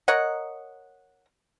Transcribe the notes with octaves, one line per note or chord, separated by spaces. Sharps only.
A#4 C#5 D#5 F#5